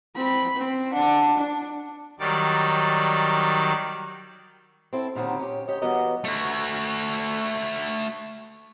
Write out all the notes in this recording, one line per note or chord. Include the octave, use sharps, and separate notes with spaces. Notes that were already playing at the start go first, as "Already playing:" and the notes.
C4 B5
C4
D4 F#5
D4
D#3 F#3 G3 D5
C4 E4 A4
A#2 D3 D#3 F#3 G3 C4
C#4 G4
D2 G4 C#5 D#5
E3 G3 B3 F#4 A#4 D#5
A3 F#4